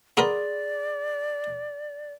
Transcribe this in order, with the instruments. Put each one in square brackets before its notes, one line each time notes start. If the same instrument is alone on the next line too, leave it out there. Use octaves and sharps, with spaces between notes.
[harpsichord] B3 A#4 B4 [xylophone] G#4 C6 [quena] D5